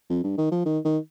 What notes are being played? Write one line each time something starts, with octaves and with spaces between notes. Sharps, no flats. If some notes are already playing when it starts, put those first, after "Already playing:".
F2
G2
D#3
F3
D#3
D#3